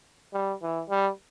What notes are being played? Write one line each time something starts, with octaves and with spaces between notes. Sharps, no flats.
G3
E3
G3